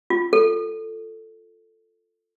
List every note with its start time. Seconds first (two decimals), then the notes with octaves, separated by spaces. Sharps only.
0.10 F4
0.33 A4